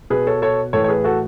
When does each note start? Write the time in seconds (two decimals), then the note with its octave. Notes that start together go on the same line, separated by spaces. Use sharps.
0.10 B2 G#4 B4
0.27 A4 C#5
0.42 A4 C#5
0.73 A2 E3 A4 C#5
0.84 C#5
0.88 G#4 B4
1.04 F#4 A4